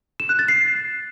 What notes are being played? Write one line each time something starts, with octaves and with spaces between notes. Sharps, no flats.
E7
F#6
A6
C7